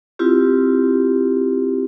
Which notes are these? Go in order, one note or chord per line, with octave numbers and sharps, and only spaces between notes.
C4 E4 F4 G4